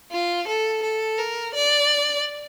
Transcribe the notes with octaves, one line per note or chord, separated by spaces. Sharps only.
F4
A4
A4
A#4
D5